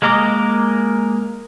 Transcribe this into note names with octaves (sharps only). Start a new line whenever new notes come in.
G#3 A#3 A#4 D#5 D6